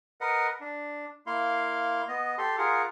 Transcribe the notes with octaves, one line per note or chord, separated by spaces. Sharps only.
A#4 B4 D#5 F#5
D4
A#3 E4 F5 C6
B3 D#5
G4 A4 C6
F4 G#4 A#4 F#5